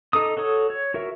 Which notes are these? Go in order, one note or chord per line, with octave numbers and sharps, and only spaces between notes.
D#4 A4 D6 D#6
F#4 A4 C#5 D#6
C#5
F#4 A#4 E5